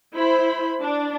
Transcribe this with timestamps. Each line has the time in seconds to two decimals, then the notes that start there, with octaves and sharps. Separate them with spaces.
0.16 E4 C5 B5
0.82 D4